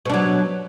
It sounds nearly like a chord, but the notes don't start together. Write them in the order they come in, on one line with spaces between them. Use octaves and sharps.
B2 D4 F#3